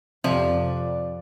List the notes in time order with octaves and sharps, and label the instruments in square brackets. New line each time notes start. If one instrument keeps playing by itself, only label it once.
[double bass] F2 [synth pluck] C3 [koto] F3 [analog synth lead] D5